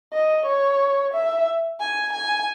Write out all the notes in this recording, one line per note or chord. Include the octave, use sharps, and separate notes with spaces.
D#5
C#5
E5
G#5
G#5